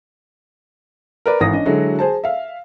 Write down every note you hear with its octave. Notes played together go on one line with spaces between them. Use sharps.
A#4 B4 D5
G#1 E3 D#6 A#6
C#4 D4 D#5
D3 F#3 G#3 E4 F#4
G#4 C5 A5
E5 F5